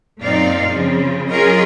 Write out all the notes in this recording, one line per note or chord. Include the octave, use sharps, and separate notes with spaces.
F#2 A#2 C4 D#4 D5 F5
C#3 F3 C4
F#3 C#4 F4 G#4 A#4 D#5